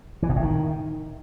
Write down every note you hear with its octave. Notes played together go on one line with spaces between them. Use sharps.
E3
B2
A2
D#3